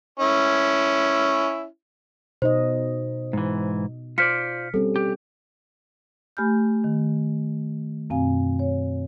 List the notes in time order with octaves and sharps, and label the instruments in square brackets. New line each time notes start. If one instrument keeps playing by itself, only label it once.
[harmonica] C#4 E4
[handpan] B2 D#4 D#5 [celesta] C5
[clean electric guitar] G#2 E3
[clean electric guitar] F4 C5 D5 [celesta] F6 B6 C#7
[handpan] G3 C4 C#4 [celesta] A4
[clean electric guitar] G4
[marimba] A3 G4 G#5 B5 F6 G6
D#3
F#2 B2 C4 F5 G#5
C#5